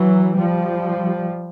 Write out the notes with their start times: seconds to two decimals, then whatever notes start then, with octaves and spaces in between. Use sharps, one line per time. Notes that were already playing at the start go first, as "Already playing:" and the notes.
Already playing: E3 F#3
0.38 F3 G3